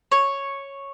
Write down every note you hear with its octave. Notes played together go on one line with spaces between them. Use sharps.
C#5